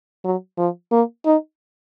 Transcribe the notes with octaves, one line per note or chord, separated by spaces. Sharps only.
F#3
F3
A#3
D#4